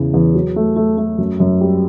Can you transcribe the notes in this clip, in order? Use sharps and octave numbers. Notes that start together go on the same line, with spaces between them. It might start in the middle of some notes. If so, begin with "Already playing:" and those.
Already playing: E2 C#3 E3
E2
F#3
A3
A3
A3
F#2
F#2
G3